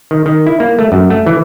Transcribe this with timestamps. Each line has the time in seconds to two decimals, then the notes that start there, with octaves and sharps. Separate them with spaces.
0.11 D#3
0.26 D#3
0.46 E4
0.60 A#3
0.79 A3
0.92 F#2
1.10 A3
1.27 E3